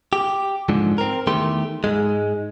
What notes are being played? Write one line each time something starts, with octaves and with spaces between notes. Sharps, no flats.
G4
G#2 D3 F3
C4 A#4
E2 D#3 A3 G4 C6
G#2 G#3